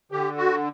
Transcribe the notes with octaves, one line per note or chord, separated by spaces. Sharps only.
D3 G4
F#4